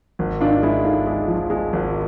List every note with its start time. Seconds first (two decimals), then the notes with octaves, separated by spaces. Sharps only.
0.19 G#1
0.41 G#2 D4 F4
0.63 G#3 E4
0.84 G#2 F4 A4
1.06 G#3
1.28 F3
1.50 G#3
1.73 G#1